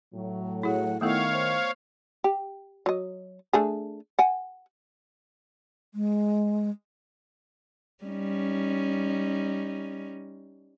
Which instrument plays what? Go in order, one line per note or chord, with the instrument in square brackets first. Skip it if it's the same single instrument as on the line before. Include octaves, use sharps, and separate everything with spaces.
[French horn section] A2 F#3
[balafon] E4 G#4 [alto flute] F#5
[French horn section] D#3 E4 [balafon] A3 B3 A4 [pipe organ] C#5 F5 [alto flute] F#5
[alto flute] C5
[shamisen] G4
F#3 D#5
A3 D4 G#4
F#5 G#5
[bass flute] G#3
[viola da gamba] G3 C#4 D#4